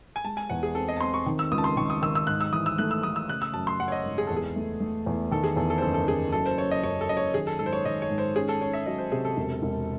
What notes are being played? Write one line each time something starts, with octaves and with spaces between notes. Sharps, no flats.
G#5
G#3 A5
G#5
E2 F#5
G#4
C4 A4
D#5
A5
C4 C6
C#6
D#3
E6
C#2 D#6
A5
C6
D#3 C#6
D#6
D#3 E6
E6
G#2 F#6
E6
E3 D#6
E6
A3 F#6
E6
A3 D#6
E6
C#3 F#6
E6
F#2 A5
C6
F#2 F#5
C#5
D#5
G#1
G#4
E2 A4
G#4
A3
A3
E2
D#3 A4
G#4
E2 A4
A4
C5
F#1 A4
A4
F#1 G#4
F#2 A4
C5
F#2 C#5
D#5
F#2 C#5
A4
F#2 D#5
C#5
D#3 G#4
A4
G#2 A4
C5
C#5
D#3 D#5
C#5
G#2
C5
C#4 G#4
A4
C#4 C#5
E5
F#3 D#5
C5
C3 G#4
A4
E1
E1